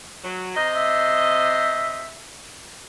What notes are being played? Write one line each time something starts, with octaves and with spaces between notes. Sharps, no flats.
F#3
C3 C5 D#5 A#5
E5